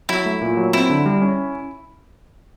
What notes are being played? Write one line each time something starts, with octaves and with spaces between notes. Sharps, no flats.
F#3 E4
A3
A#2
F#3
C4 E4
D3
G3
C#4